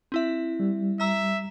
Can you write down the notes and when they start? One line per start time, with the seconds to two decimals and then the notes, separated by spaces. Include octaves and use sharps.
0.12 C4 E4 E5
0.60 G3
1.00 E5 A#5 E6